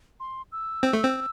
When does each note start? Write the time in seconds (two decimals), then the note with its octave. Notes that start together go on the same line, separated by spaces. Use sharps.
0.20 C6
0.52 E6
0.83 C4
0.93 A3
1.03 C4